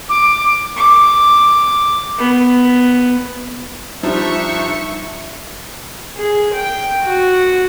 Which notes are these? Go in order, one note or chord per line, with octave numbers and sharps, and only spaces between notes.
D6
D6
B3
F3 G3 D4 D#4 E5 C#6
G#4
G5
F#4